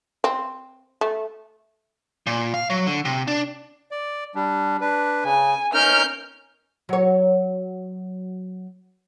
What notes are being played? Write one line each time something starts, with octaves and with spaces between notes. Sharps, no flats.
C4
A3
A#2
F5
F#3
D3
C3
D4
D5
G3 D4
D4 B4
C#3 G#5
C#4 D#4 A#4 F6 G6
F#3 C#5